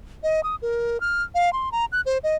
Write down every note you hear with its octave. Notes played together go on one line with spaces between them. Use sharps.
D#5
D#6
A#4
F6
F5
C6
A#5
F#6
C5
D#5